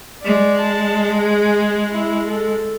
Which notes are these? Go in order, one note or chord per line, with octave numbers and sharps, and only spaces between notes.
G#3 D5
A5
G#4
E4
A4